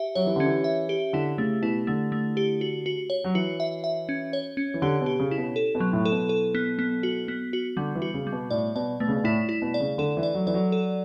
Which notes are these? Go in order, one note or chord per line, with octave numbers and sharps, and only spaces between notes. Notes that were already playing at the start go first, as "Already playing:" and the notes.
Already playing: G4 E5
F#3 C#5
E3
D3 C#4
E3
E5
G4
D3 E4
C#3 A3
B2 E4
D3 A3
A3
G4
F#4
F#4
C#5
F#3
E3 F#4
E5
E5
C#4
C#5
C#4
E3
D3 G4
B2
G4
C#3
E4
B2
A4
B2
F#3
A2
A4
B2
A4
B3
B3
F#4
B3
F#4
D3 G3
E3
F#4
C#3
G3
B2
A2 D5
B2 D5
B2 A3
C#3
B2
A2 E4
E4
B2
D5
C#3
D3 A4
E3
D5
F#3
E3 D5
F#3
A4